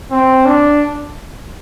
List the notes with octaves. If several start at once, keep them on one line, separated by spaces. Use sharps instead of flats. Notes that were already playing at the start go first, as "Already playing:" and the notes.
C4
D4